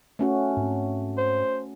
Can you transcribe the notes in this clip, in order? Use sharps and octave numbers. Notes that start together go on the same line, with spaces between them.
A3 C#4 F#4
G#2 C4
C5